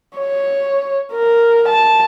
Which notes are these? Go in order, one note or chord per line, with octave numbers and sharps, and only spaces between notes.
C#5
A#4
A5